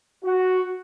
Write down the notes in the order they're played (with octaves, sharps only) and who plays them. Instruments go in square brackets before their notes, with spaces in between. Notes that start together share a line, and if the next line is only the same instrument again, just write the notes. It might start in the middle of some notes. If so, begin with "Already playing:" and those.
[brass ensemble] F#4